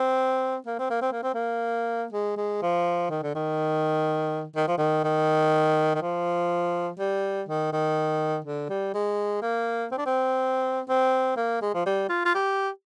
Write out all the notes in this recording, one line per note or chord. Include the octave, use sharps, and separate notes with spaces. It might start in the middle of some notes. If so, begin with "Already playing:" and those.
Already playing: C4
A#3
C4
A#3
C4
A#3
C4
A#3
G#3
G#3
F3
D#3
D3
D#3
D#3
F3
D#3
D#3
D#3
F3
G3
D#3
D#3
D3
G3
G#3
A#3
C4
D4
C4
C4
A#3
G#3
F3
G3
F4
F4
G4